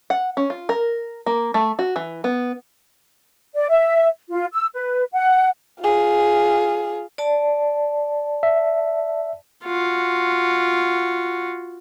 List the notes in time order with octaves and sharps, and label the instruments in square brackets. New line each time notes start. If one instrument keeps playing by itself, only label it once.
[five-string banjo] F#5
C#4
F4
A#4
A#3
A3
F#4
E3
B3
[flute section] D5
E5
F4
E6
B4
F#5
[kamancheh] F4 G#4
[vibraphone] D5 A5
[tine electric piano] E5
[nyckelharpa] F4 F#4